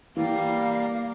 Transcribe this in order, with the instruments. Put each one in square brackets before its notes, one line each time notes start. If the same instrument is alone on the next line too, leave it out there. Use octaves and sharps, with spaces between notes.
[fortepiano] E3 [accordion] G3 [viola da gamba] A#3 [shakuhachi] F5